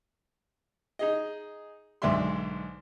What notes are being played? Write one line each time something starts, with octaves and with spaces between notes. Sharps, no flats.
D#4 G#4 D#5
B1 G#2 D3 D5 E5 C6